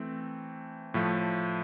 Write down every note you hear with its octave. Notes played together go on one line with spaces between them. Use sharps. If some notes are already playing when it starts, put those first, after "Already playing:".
Already playing: E3 A3 C4
A2 F3 A3